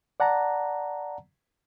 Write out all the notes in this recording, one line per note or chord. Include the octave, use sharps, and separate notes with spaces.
D5 F#5 A5 A#5